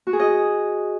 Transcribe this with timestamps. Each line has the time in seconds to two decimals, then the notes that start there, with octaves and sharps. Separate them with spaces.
0.07 F#4
0.13 G#4
0.19 D#5